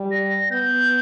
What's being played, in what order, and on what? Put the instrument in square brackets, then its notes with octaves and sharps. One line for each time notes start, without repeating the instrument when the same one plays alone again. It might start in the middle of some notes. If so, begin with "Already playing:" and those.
Already playing: [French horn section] G3
[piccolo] A#6
[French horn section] B3 [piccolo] G6